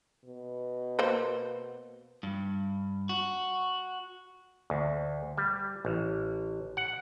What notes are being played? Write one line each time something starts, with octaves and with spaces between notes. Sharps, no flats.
B2
A#3 C5
G2
F#4
D2
G3
A1
F#5